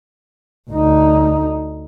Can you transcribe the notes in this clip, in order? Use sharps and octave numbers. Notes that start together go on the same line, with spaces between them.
D2 D#4